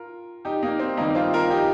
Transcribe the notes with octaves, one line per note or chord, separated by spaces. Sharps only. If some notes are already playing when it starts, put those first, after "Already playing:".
Already playing: F4 A#4
D#4 G4
A#3 D#4
C4
G2 D#3 G3 A#3 D#4
C4 F4
F4 A#4
D#4 G4